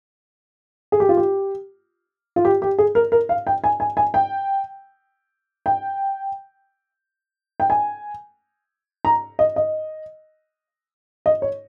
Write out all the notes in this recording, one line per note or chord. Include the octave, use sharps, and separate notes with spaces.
G#4
G4
F4
G4
F4
G4
G4
G#4
A#4
A#4
F5
G5
G#5
G#5
G#5
G5
G5
G5
G#5
A#5
D#5
D#5
D#5
C#5